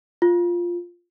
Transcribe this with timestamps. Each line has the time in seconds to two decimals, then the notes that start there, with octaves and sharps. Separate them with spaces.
0.22 F4